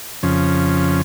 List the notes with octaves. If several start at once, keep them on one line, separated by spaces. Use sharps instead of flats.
F2 C#3 F3 C#4